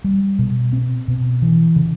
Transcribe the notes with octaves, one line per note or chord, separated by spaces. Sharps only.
G3
B2
C4
B2
E3
C#3